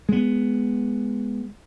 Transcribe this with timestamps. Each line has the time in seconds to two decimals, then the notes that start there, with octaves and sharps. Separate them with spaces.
0.09 G#3 B3